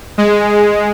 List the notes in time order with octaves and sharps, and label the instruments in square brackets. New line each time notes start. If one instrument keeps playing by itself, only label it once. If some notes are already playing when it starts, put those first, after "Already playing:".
[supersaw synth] G#3